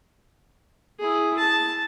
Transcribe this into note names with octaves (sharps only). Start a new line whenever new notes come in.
E4 G#4
A5